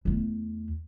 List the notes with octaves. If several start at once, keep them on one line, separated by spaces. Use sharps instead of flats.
E2 A3